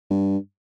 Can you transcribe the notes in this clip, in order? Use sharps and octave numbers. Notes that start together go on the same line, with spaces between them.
G2